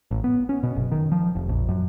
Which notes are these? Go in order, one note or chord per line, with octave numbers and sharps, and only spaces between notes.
A1
B3
C#4
B2
F#1
D#3
F3
F1
A#1
F#2